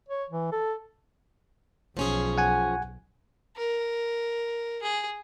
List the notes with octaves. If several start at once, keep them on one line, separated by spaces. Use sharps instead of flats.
C#5
E3
A4
B1 F3 C#4 G#4
F#5 G#5
A#4
G#4